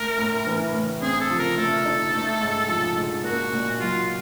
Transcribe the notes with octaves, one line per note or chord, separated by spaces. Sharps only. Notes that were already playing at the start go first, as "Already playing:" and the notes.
Already playing: A3 A#4
A2
E3
A2
C4 G#4
A4
F3
A#4
A3 A4
D#4
A3
G#2
F3
G#2
A#3 F#4
A#2
F#3 F4